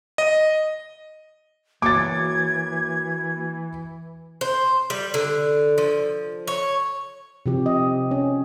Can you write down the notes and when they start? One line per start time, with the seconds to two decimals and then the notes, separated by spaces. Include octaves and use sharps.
0.18 D#5
1.82 E3 A#3 F#4 C#5 D6 G#6 A6
4.41 C5
4.90 G3
5.14 D3
5.78 F3
6.47 C#5
7.46 C3 F3 G4
7.66 D#5
8.11 C#4